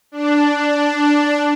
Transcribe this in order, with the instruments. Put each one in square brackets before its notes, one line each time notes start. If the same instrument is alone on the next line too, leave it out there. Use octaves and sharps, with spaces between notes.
[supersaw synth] D4